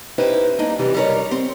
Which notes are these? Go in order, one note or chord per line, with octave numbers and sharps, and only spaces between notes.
C#4 D#4 E4 G4 B4 C5
G3 A#3 D4 D#4
F#2 C3 E3 G3
G3 D#4 A4 A#4 C#5
C4